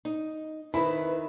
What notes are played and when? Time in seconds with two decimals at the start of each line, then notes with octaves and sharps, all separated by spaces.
0.05 D#4
0.74 D#3 C4 E4 B4 B5